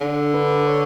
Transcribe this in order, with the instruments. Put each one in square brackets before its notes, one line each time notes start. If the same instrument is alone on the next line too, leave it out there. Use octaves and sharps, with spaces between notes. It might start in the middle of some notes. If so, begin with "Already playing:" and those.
[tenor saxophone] D3 [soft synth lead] D4
[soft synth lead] B4
C#5